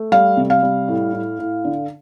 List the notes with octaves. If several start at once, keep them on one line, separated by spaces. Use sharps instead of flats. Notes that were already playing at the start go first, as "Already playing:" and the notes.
Already playing: A3
G3 F5
C3
F5
G3
A2
A2
A2
D3